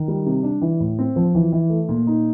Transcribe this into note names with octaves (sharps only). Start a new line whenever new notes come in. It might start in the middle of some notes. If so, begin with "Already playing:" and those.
Already playing: D#3
G3
C3
D4
E3
A2
C4
F3
E3
E3
A3
A#2
D#4